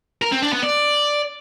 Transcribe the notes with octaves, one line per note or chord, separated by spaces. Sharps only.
A#4
C4
D4
B3
D5